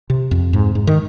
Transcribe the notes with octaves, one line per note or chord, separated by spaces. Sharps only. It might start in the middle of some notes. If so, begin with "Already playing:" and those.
C3
F2
G#2
G#2
D#3